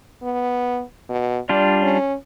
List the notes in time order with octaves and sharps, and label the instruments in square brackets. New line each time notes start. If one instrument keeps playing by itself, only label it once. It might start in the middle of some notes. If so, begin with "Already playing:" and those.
[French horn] B3
B2
[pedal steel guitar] G3 D4 F4 [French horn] D5
[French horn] C#4